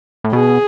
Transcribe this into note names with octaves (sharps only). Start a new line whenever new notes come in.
A2
B2 G#4